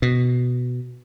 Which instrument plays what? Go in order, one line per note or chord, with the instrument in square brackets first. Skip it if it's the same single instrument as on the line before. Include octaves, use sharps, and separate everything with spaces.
[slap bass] B2